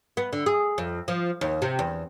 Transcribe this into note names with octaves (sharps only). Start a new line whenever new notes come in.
B3
D3
G#4
F2
F3
D#2
C3
E2